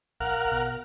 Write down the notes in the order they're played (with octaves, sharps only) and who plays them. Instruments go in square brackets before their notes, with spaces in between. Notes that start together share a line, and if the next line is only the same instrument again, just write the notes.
[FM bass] A#1 [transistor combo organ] A#4 F5 F#5
[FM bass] B2